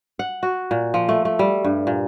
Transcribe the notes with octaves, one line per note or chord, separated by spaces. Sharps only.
F#5
F#4
A#2
F3
A3
A3
G3
G2
A#2